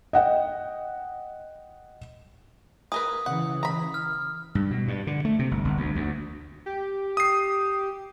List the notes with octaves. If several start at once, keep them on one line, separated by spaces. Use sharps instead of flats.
D#5 F#5 G5
G#4 A#4 B4 D#6
C#3 E3 F#5
A#5 B5
F6
G2
B2
G2
D3
A3
C3
G1
G1
D2
D2
G4
D#6 C7